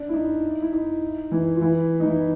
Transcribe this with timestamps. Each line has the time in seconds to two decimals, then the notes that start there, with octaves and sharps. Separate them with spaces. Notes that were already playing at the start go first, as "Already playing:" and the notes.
Already playing: D4
0.09 E4
0.14 D#4
0.62 E4
0.73 D#4
1.31 E3 E4
1.56 F4
1.61 E3 E4
2.00 D#4
2.05 E3 E4